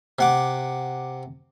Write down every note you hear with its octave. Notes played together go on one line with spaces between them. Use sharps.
C3 F#5 D6